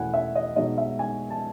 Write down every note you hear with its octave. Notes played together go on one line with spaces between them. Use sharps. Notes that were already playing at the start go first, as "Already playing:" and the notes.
Already playing: E2 B2 A3 C#4 E4 F#5 G#5
E5
D#5
B1 B2 G#3 D#4 D#5
E5
G#5
A5